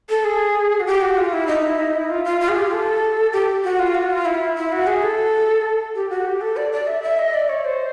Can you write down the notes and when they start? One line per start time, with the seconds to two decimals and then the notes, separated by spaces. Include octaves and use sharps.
0.10 A4
0.24 G#4
0.80 F#4
0.87 G4
1.01 F#4
1.17 F4
1.32 E4
1.47 D#4
1.63 E4
1.79 D#4
1.94 E4
2.09 F4
2.25 F4
2.40 F4
2.49 G#4
2.56 G4
2.71 A4
3.32 G4
3.64 F#4
3.79 F4
3.95 F#4
4.10 F4
4.25 E4
4.56 E4
4.72 F#4
4.87 G#4
5.02 A4
5.95 G4
6.10 F#4
6.26 G4
6.41 A4
6.56 D5
6.72 D5
6.87 E5
7.02 E5
7.18 D#5
7.34 D5
7.49 C#5
7.64 C5